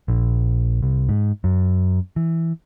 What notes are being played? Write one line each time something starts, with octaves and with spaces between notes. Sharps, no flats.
A#1
C2
G#2
F#2
E3